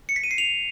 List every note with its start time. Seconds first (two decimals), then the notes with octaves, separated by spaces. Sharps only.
0.09 C#7
0.16 B6
0.24 D#7
0.31 C7
0.38 F7